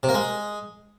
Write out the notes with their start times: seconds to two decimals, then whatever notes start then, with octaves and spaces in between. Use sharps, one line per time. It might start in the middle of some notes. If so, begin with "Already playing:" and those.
0.03 C3
0.09 A#3
0.14 G#3